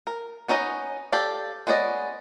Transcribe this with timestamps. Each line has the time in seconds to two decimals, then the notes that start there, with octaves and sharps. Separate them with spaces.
0.07 A#4
0.48 B3 C#4 D#4 A#4 D#5
1.12 G4 A4 D5 F5
1.67 G#3 B3 C#4 D5 D#5